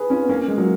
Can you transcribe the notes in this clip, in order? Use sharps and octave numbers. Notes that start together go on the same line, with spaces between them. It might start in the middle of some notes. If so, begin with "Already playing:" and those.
Already playing: G#4 B4
C#4 F4
B3
A#3 C#4
G#3
F#3 A#3